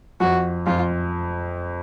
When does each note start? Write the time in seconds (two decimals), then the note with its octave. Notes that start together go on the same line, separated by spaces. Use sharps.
0.20 F2 F#4
0.66 F2 F4